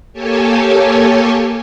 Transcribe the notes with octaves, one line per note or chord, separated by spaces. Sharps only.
A#3 G4 A4 C#5 G#5 A5